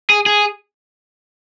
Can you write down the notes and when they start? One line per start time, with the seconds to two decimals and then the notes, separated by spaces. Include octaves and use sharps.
0.10 G#4
0.26 G#4